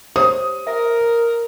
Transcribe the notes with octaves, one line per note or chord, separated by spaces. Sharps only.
G4 C5 C#5 D#6
A#4 E5